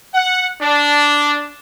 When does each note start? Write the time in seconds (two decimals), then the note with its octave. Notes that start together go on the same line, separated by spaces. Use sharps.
0.13 F#5
0.60 D4